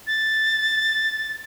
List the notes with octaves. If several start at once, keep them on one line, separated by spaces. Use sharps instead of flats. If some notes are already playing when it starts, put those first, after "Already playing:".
A6